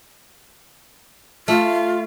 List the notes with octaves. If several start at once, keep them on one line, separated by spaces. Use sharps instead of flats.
A3 F4